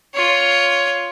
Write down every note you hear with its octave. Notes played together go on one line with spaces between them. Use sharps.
F4 C#5